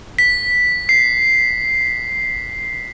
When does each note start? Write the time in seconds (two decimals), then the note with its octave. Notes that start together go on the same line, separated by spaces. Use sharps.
0.19 B6
0.89 C7